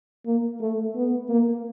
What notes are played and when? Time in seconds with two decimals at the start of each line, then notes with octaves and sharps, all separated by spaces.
0.26 A#3
0.61 A3
0.96 B3
1.29 A#3